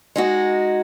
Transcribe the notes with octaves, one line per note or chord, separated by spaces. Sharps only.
G#3 D#4 F#4